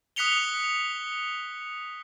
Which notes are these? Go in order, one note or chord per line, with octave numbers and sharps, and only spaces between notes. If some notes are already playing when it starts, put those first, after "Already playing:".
D#6 F#6 B6 C#7 F7 G7